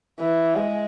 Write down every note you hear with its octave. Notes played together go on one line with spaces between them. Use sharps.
E3
G#3